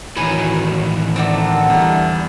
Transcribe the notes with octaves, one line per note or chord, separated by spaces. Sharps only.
A2 D#3 E3 F#3 B4 G#5
D3 A3 C4 D#4 A#4 F#5
E2 G3